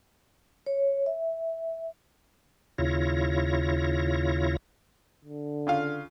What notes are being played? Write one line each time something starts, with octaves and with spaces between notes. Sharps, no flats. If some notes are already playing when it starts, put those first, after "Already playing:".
C#5
E5
D#2 C#3 E4 F4 C#5 A#6
D3
C#3 F4 F5